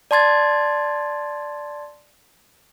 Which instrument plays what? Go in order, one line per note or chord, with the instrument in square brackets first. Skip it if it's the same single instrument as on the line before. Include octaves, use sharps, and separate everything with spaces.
[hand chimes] D5 A5 C6 G#6 A6